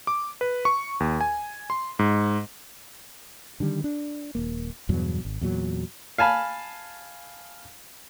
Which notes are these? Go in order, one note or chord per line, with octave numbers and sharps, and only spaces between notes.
D6
B4
C#6
D#2
G#5
C6
G#2
D3 D#3 G3
D4
D#1 A#3
E2 G2 B2 F#3
G#1
E2 A#2 F#3
F5 G#5 A5 B5